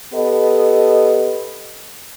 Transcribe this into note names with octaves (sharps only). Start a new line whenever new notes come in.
B3 G4 A4 D#5